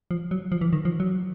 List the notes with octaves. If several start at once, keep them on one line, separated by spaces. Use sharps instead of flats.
F3
F#3
F3
E3
D#3
F3
F#3